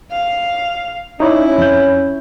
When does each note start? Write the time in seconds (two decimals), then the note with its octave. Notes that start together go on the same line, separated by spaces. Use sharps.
0.12 F5
1.20 C#4 D#4 E4 C#5 D5
1.58 F2 G6